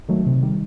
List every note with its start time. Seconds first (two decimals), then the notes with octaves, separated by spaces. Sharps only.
0.08 D#3 F#3 A3
0.26 C3
0.43 D#3 G3